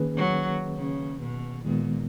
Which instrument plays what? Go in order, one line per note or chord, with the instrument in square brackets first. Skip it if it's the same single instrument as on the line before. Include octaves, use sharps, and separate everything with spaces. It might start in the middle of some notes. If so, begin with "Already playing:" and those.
Already playing: [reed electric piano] D#3 A#3 C#4 G#4 B4
[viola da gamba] F#3
C#3
B2
[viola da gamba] A#2 [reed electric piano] D#3 G#3 B3